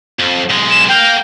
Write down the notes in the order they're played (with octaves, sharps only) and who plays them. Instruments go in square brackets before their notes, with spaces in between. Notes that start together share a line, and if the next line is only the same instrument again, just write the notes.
[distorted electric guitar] F2
B1 G#3
[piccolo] E7
[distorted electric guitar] A#4 F5 [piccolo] G5